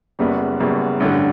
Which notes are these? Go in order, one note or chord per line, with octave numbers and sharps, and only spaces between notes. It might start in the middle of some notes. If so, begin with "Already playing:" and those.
F#1 F#2 C#3 G3 B3
F#1 F#2 C#3 G3 B3
A1 G2 D3